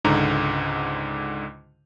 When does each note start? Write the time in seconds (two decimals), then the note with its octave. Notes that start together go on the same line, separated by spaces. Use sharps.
0.05 C#2 G#2 D3 A#5